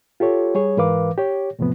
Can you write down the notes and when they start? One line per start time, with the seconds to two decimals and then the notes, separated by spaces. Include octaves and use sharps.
0.20 F4 G4 A4 C#5
0.55 G3 G#4 C#5
0.77 G#2 E3 A#4 B4 F5 D6
1.18 G4 C#5
1.59 E2 A2 C3 F3 B3